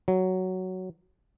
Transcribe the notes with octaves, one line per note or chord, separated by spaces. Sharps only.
F#3